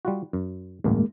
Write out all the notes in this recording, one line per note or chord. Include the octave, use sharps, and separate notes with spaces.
G3 F4 F#4
F#2
A1 D2 G2 G#3 A#3